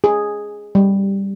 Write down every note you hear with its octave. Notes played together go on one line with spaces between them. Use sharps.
G#4
G3